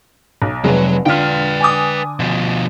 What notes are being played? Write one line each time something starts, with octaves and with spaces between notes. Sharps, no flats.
B1
F1 F#3 G#3 B4
D3 F4 B4 G5 F6
G#5 D6 D#6
B2 F3